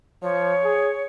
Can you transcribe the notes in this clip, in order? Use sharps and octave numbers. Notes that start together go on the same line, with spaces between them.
F3 C#5
G#4